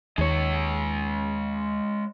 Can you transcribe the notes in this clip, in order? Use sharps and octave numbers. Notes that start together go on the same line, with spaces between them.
D#2 G#3 C#5